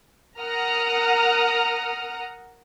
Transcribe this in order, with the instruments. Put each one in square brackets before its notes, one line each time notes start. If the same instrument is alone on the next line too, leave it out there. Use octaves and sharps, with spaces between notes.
[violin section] A#4 F#5 A#5 D#6 F6